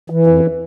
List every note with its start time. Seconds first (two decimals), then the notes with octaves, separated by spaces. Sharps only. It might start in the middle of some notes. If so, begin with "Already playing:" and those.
0.10 E3
0.27 F2